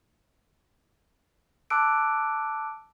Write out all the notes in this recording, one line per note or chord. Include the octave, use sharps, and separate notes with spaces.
A5 D6 E6 F#6 D7